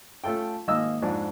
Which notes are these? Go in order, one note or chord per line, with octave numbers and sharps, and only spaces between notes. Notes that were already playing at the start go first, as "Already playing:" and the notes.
A3 C#4 F4 A4 G5
G#1 A#3 D#5 E6
F2 G#2 D4 F#4 D5